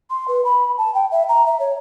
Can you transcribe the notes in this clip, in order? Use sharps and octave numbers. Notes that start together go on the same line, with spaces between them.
C6
B4
B5
A5
G5
E5
A#5
E5
C#5